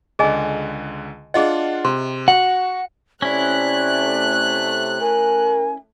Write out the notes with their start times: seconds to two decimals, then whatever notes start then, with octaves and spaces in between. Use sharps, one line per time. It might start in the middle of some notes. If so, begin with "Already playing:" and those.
0.19 C#2 D3 G#4 D#5 G#5
1.34 D4 F4 G#4 D#5 F#5
1.85 C3 C6
2.28 F#4 F#5
3.22 C3 A3 C#4 E4 D5 F#6
5.01 A#4 G#5